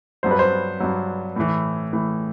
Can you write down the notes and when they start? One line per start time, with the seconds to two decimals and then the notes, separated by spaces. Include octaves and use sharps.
0.23 G2 F#3 C5
0.31 B4
0.39 C5
0.80 G2 F#3
1.36 A2 E3
1.93 A2 E3